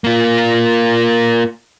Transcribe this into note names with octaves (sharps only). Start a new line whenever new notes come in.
A#3 F4